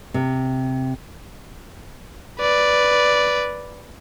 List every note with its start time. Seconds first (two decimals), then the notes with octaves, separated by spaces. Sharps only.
0.14 C3
2.39 B4 D5